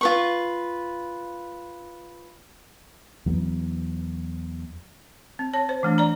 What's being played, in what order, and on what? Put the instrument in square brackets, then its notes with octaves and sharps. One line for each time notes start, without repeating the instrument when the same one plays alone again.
[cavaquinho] F4 B4 C#6
[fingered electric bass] E2 F#3 A3 B3
[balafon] C4
C#5 A5
C5
E3 A3 D4
D5 A#5